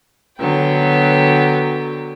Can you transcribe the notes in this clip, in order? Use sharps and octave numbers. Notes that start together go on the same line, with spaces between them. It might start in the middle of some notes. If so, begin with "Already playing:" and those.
D3 F#3 B3 G5